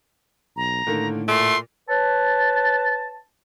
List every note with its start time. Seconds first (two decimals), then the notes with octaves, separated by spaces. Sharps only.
0.57 B1 A#5
0.87 A2 D3 D#3 A#3
1.28 A#2 A3 C6
1.88 B4 C#5 A5